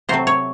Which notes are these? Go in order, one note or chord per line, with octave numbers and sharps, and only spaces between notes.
C3 F#3 A3 C4 C5
C#5